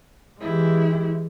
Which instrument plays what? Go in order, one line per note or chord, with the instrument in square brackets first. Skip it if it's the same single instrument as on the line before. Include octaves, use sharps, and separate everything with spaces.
[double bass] E3 G#3 [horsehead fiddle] E4 G4